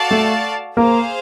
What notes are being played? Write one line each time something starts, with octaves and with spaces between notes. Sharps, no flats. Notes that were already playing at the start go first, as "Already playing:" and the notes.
Already playing: F#4 A4 D5 F5 A5
A3
A#3 G#4 C5 F5